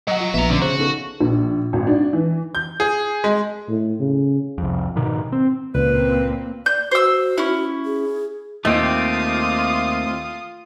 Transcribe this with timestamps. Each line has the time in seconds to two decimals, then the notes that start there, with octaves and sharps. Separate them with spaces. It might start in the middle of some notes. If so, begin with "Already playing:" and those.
0.07 F#3 D#5 F#5
0.20 F4
0.34 A#1 A#2 B3 E5 A#5
0.50 D3 F3 C#4 D4
0.62 C#3 F#4 C5
0.77 B3 D#4 A4
1.21 A#1
1.73 G#1
1.87 D4
2.13 E3
2.55 G6
2.80 G#4
3.24 G#3
3.68 A2
4.00 C#3
4.58 C2 F2
4.96 G#2 B2 D#3
5.32 C4
5.75 C#2 A#2 A#3 C4 B4
6.66 D5 G6
6.91 F#4 C5 E6
7.38 C#4 E4
7.85 G#4
8.65 D#2 A3 C4 F4 G4 D#6